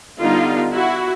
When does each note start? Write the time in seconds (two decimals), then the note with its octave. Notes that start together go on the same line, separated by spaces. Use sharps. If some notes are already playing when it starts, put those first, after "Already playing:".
0.20 D3 G3 B3 D#4 F4
0.73 E4 F#4